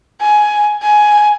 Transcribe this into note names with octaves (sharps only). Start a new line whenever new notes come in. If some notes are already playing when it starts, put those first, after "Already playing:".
G#5
G#5